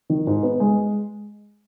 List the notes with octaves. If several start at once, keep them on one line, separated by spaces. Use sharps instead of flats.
D#3
G#2
B3
G#3